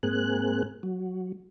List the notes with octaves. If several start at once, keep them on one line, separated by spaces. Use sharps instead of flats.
G#2 A#3 C4 G#4 F#6
F#3